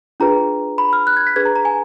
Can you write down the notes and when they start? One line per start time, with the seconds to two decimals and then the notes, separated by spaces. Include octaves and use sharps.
0.20 D4 F4 G#4 B4 A#5
0.78 B5
0.93 F6
1.07 F#6
1.17 G#6
1.27 B6
1.36 D4 G#4 B4 G#6
1.45 A#5
1.56 A#5
1.65 G#5